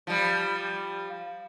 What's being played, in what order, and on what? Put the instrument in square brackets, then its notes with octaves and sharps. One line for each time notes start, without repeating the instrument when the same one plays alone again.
[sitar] F3 G3